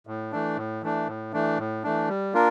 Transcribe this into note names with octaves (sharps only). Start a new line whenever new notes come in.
A2
E3 A3 D4
A2
E3 A3 D4
A2
E3 A3 D4
A2
E3 A3 D4
G3
A#3 D4 F4 A#4